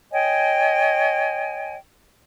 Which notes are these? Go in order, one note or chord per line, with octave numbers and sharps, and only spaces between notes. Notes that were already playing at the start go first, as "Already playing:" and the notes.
C#5 D#5 G5 G#5